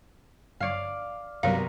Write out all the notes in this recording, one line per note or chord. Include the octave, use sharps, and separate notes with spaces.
G1 C#5 D5 F5
C2 G2 F#3 G3 B3 A#4 F5